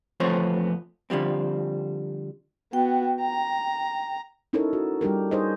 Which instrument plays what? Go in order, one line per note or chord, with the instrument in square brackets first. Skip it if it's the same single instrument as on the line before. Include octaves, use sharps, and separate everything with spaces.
[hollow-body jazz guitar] E2 F3 A3 B3 C4 C#5
D3 F3 G3 C4
[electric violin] B3 F#4 [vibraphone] G5
[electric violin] A#5
[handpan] C#4 D#4 E4 A4 A#4 C#5
F#4
G3 D4 G4 A#4
D#4 G#4 C5 C#5 D#5